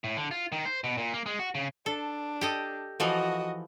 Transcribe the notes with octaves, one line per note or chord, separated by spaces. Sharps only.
A2
D3
F4
D#3
C5
B2
A#2
A#3
G#3
F#4
C#3
D4 A4
G4 A4 D#5
E3 F3 F#4 A4 D#5